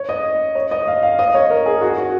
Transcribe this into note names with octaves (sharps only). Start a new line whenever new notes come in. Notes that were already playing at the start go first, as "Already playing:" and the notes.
Already playing: C#5
D#5
C#5
D#5
F5
F5
D#5
C#5
A#4
G#4
F#4
F#4